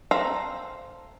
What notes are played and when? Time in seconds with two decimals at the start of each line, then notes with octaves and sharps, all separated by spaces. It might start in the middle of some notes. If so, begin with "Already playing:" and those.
0.11 C4 A4 E5 F5 A#5